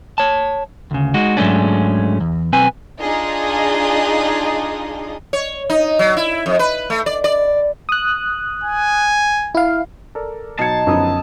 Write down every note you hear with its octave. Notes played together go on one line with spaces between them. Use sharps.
C#5 A5
D2 C#3
G#3 D#4 F#4
G#2 F#3 G#3 A3 C#4 D4
E2
B1 C4 B4 G#5
D4 D#4 F4 G#4 D#5
C#5
D#4
F#3
E4
F2
B4
A3
D5
D5
D#6 F#6
G#5
E4 F5
A4 A#4 D5
B2 F#3 D#4 A5 G#6 C7 C#7
F#2 D3 F3 B3 D#4 D#6 E6